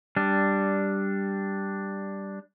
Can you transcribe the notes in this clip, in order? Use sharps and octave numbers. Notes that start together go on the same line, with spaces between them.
G3 D4